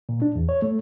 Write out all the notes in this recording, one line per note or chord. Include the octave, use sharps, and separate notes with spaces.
A#2
D4
E2
C#5
A3